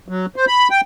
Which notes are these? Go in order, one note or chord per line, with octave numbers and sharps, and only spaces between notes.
F#3
C5
B5
G5